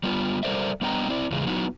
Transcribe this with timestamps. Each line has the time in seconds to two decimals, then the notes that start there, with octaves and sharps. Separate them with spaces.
0.03 G3 B3 F4
0.43 G3 A4 A#4 C5 D5 E5
0.81 G3 B3 D4 D#5 G5 A#5
1.09 C4 E4 D5
1.31 E2 C#3 G#3
1.47 F#3 B3 D#4 E4 F#4